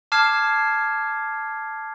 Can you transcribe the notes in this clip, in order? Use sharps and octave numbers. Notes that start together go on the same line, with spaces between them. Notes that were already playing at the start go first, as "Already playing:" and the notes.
A5 D6 F6 G#6 C7 E7